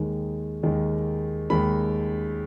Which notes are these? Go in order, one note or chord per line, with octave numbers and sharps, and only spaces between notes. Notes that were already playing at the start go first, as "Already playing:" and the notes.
Already playing: D#2 D#3 G#3
D#2 D#3 G#3
D#2 D#3 G#3 B5